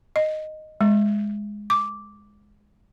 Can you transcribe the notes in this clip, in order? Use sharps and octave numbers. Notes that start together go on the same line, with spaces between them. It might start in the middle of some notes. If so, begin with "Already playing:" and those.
D#5
G#3
D6